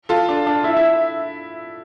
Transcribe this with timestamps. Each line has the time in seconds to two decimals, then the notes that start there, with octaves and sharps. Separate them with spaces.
0.09 F4 A4
0.29 D4
0.47 D4
0.64 E4 E5
0.77 E4